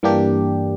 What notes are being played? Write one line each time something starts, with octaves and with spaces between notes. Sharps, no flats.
G2 E3 A#3 D4 G4